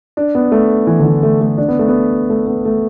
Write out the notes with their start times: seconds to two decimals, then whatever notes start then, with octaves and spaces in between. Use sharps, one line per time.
0.17 D4
0.35 B3
0.52 A3
0.87 E3
0.99 D3
1.05 E3
1.23 A3
1.41 A3
1.58 D4
1.68 B3
1.79 A3
1.89 B3
2.30 A3
2.47 B3
2.65 A3